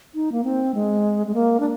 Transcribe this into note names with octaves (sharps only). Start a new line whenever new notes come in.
D#4
A#3
C4
G#3
G#3
A#3
D4